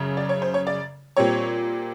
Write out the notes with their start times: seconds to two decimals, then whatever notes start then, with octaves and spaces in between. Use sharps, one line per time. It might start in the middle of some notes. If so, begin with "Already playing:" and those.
Already playing: F#2 C#3
0.17 D5
0.29 C#5
0.42 C5
0.54 C#5
0.67 D5
1.17 A#2 G3 C4 C#5